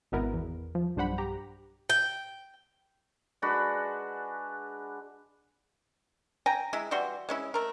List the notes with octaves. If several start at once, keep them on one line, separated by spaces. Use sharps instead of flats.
G#1 B2 B3 E4 A#4 B4
E2
F3
B1 G2 D4 C5 F#5 B5
G4 A#5
G5
G#3 D4 F#4 B4
G5 G#5 A#5
G#3 E4
E3 G3 F#4 C6
G#3 C#4 E4
A3 A#4